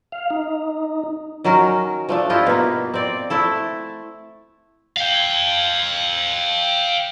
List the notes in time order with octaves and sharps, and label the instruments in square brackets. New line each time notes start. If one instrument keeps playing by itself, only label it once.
[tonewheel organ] F5
D#4
[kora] D#3 F#3 C#4 A#4
F3 A3 D4
E4 F4 G4 D#5
B2 A#3
C4 D5
A3 E4 A4
[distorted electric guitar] F5 G5